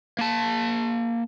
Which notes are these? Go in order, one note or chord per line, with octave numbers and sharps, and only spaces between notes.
A#3 A5